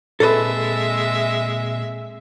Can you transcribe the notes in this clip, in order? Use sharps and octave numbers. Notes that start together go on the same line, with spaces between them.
A#2 G#3 C4 A4 B4 E5